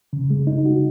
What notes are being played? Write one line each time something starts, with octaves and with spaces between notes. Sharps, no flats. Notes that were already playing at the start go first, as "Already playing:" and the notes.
C#3
G#3
D#4
F#4